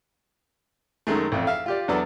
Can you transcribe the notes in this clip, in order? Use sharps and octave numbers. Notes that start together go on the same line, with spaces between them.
F#2 D#3 G#3 A3
A1 F2
E5 F5
F4 G4 D5
E2 F#3 D4 A4 B4